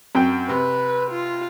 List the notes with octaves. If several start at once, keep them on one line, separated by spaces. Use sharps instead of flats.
F#2 C4 G5
C3 B4 B5
F4